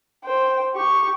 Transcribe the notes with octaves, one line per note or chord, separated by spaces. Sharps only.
C5 G5
G4 C#6